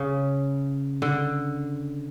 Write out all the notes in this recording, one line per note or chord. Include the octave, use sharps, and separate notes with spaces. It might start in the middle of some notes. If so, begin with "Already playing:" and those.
Already playing: C#3
D3